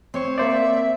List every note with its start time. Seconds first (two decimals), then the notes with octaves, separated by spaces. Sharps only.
0.14 C4 C5 C#5 C#6
0.38 A#3 C5 D5 E5